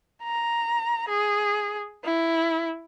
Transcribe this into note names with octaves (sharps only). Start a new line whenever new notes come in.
A#5
G#4
E4